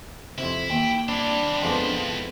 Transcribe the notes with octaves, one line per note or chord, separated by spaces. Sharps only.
F2 C3 E4
D#2 G5
G3 C4 D4 E4
F2 F3 G#3 B3